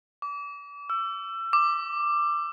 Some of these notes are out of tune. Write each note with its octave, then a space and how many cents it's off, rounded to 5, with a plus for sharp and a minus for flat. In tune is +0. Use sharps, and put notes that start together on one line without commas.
D6 -35
E6 +30
D6 +10